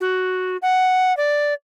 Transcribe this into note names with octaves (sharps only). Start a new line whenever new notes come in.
F#4
F#5
D5